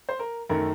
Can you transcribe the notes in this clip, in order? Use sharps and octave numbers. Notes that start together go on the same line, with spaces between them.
C5
A#4
F#2 D#3 A3 A#4